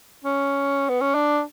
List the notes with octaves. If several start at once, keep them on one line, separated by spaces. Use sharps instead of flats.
C#4
B3
C#4
D4